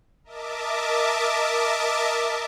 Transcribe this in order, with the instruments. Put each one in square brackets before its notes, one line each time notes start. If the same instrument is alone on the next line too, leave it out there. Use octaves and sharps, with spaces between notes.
[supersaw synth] A#4 D#5 E5 A5 D6